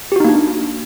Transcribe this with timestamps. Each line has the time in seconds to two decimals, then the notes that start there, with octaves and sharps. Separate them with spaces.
0.12 G4
0.16 F#4
0.20 D#4
0.25 A#3
0.29 D4